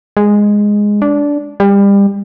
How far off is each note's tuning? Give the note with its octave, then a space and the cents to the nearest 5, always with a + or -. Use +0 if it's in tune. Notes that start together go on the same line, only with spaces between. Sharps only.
G#3 -5
D4 -15
G3 +30